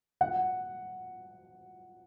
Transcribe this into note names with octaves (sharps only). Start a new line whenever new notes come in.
F#5